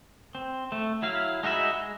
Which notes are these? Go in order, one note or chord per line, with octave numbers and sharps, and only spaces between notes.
C4
A3
F#3 E4 F5
G#3 D#4 F#4 E5 B5
G#3